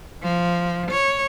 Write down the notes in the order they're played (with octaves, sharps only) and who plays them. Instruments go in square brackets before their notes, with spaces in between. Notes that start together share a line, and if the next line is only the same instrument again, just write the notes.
[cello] F3
C#5